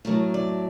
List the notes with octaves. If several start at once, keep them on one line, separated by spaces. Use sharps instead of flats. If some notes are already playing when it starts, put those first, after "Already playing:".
A2 F#3 A3 A#4
D5